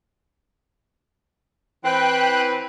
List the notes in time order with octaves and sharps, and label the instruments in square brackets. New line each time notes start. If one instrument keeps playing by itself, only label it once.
[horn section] E3 C4 B4 [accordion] G5 F#6